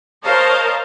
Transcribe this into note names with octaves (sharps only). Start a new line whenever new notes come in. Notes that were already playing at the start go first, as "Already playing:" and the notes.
A#4 C5 C#5 D#5 F5 A5